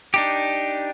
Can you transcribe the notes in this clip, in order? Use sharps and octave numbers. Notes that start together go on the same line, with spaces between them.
D4 D#4 G4